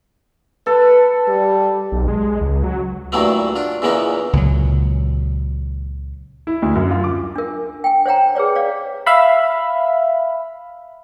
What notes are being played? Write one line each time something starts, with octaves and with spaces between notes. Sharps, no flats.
A4 B4
G3
B1
G#3
C#2
F#3
G2 A#2 E3 F#3 A3 B3
D4 F4
E2 A#2 C#3 E3 B3 D#4
C#2 A#2 F#3
E4
D2
F#2
F4
D6
D4 A#4
G5 G#5
C5 C#5 F#5 G5 A#5
G#4 B4 C#5 D5
C#5 D5 F5
E5 F5 B5